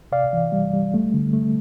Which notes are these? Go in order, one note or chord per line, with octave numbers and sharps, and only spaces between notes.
C3 D5 F5
E3
G3
G3
A3
D3
A3